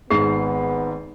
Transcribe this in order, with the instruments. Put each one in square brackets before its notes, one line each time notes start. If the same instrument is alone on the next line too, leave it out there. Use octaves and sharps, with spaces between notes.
[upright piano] G#1 G#2 C7 [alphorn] B3 [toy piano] G#4